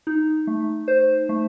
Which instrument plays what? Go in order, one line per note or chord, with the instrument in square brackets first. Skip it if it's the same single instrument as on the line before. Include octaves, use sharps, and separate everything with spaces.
[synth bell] D#4
A3
C5
A3